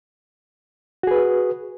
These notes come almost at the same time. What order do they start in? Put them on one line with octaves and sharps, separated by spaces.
F#4 G#4 B4